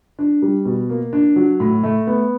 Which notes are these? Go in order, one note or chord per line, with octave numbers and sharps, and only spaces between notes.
D4
G3
B2
A#3
D4
F#3
A2
A3
B3